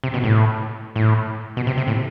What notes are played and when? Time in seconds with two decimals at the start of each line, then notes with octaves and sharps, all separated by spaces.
0.04 C3
0.14 B2
0.24 A2
0.96 A2
1.57 B2
1.67 C3
1.77 C3
1.88 A2